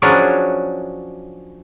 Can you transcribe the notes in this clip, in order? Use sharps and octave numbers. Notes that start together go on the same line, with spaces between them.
F3 F#3 C#4 D4 G#4 B4